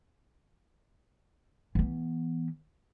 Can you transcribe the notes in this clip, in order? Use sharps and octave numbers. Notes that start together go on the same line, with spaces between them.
E3 B3